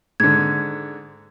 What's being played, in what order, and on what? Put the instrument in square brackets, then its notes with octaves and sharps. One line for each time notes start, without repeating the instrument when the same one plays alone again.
[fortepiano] G#2 D3 [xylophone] G#6